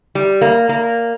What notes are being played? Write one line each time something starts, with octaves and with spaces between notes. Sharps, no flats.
G3
A#3
A#3